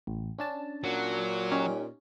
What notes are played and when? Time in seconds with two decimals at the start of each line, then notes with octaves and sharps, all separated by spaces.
0.07 A1
0.39 C#4 D4 A5
0.84 A#2 F#3
1.52 C#4 D#4 G4